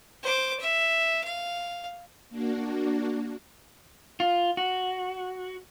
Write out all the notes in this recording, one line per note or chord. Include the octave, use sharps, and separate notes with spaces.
C5 D6
E5
F5
A#3 D4 F#4
F4
F#4